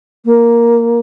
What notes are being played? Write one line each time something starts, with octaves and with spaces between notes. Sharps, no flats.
A#3